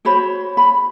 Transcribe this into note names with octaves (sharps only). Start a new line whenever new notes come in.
F#4 C5 C#5 B5
B5